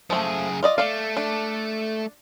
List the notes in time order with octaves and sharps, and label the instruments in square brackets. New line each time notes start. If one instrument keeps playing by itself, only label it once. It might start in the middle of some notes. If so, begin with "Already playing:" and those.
[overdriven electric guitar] F#2 G#4 [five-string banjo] F3 A3
[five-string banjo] F4 D5 D#5
[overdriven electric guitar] A3 [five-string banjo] D5 F5
[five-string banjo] D4